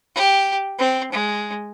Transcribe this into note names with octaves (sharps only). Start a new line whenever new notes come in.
G4
C4
G#3